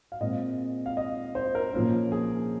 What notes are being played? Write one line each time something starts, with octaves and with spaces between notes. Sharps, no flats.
F5
A#2 G#3 C4 D#5
F5
D#5
C5
A#4
A#2 F3 A#3 C#4
G#4